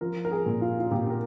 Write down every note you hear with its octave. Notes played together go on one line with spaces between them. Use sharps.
F3 A#4
A#4
G#4
A#2
F4
F4
A#2 G4
A#4